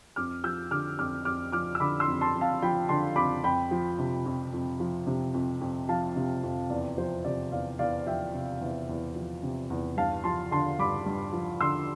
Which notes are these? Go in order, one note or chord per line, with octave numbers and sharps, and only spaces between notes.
F2 D6 F6
F3 E6 G6
D3 D6 F6
F2 D6 F6
F2 D6 F6
F3 D6 F6
E6
D3 B5 D6
C6 E6
F2
A5 C6
F2
F5 A5
F3 G5 B5
D3 A5 C6
F2 B5 D6
F2 G5 B5
F3
C3
F2
F2
F3
C3
F2
F2
F3 F5 A5
C3
F2
E2 D5
F3 C5
C3 D5
E2 D5 F5
E2 D5 F5
F3 E5 G5
C3
E2
E2
F3
C3
E2
G2 F5 A5
F3 A5 C6
D3 A5 C6
G2 B5 D6
G2
F3
D3 C6 E6